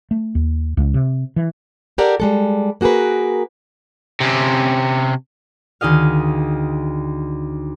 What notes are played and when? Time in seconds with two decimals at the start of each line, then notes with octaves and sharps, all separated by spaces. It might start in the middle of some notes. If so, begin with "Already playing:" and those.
0.11 A3
0.35 D#2
0.77 C#2
0.94 C3
1.36 E3
1.98 G4 A4 A#4 D5 F#5
2.20 G3 G#3 A4
2.81 A#3 F#4 G#4 A#4 B4
4.20 C3 C#4
5.81 D2 D#3 G#4 D#5 F5